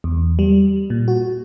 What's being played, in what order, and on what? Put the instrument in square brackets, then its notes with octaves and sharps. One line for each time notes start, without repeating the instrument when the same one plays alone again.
[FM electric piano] E2
G3
A#2
F#4